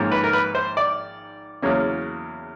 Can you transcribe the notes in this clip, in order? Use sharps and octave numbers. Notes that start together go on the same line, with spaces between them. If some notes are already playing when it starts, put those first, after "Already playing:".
Already playing: G#1 G#2 F3 A#3 C#4
B4
A#4
B4
C5
D5
E2 C#3 F#3 A#3 C#4